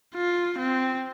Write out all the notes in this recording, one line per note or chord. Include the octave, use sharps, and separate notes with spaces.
F4
C4